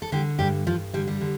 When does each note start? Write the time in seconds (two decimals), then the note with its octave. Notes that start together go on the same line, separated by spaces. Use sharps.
0.02 A4
0.12 D3 G3 G4
0.39 G2 G3 G4
0.67 G2 F3 F4
0.93 D3 G3
1.07 G3
1.21 D3